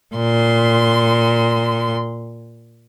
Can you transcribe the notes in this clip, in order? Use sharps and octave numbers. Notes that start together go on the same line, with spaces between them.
A#2 C6